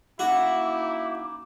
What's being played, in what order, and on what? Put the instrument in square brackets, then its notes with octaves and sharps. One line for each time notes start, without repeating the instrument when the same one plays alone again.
[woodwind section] A#3 C#4 D#4 [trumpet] E4 [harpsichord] F#4 [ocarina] D6